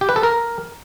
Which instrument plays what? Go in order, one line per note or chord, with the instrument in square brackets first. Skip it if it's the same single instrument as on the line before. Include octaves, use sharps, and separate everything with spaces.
[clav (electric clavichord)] G4
B4
A4
A#4